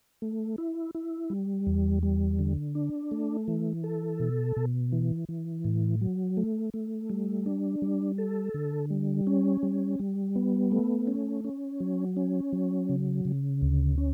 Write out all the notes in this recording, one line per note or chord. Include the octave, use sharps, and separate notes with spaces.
A3
E4
E4
G3
E2
G3
D3
D4
A3
E3
A4
B2
B2
E3
E3
A2
F#3
A3
A3
G3
D4
G3
A4
D3
G3
C#4
G3
G3
B3
A3
C#4
C#4
F#3
C#4
F#3
C#3
C#3
D2
C#4